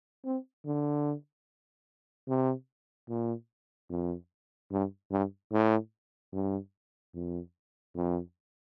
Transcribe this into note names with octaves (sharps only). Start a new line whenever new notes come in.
C4
D3
C3
A#2
F2
G2
G2
A2
G2
F2
F2